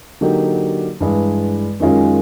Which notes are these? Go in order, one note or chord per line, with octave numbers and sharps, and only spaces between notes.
D3 F#3 A#3 D#4 G4
G2 E3 G#3
F#2 D#3 G#3 C#4 F4